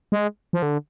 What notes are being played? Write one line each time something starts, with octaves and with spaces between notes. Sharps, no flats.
G#3
F3
D3